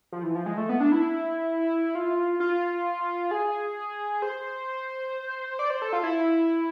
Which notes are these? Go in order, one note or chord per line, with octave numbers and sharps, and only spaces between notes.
F3
E3
F3
G#3
A3
B3
D4
E4
F4
F4
G#4
C5
D5
C5
A4
F4
E4